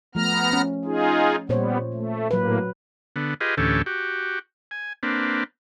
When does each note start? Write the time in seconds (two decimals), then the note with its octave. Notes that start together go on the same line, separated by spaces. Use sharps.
0.15 F3 A3 B3 A#5 F6
0.53 C#4
0.85 D#4 F4 G#4
1.49 A#2 G3 B3 C5 C#5
1.93 A3
2.31 A2 F#3 A#3 B4
3.16 D3 B3
3.41 F4 G4 G#4 B4 D#5
3.57 D2 A2 E3 C#4 G4 A4
3.86 F#4 G4
4.71 G#5
5.03 A#3 C4 D4 B4